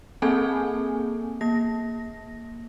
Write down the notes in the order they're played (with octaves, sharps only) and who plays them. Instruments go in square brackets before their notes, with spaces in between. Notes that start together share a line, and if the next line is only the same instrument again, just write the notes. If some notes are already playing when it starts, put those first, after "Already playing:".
[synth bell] A#3 C4 G#4 A4 G#5
A#3 A#6